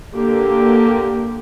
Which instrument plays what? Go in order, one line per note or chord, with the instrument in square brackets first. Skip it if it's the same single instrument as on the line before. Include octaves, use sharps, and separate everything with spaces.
[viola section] D3 A#3 G4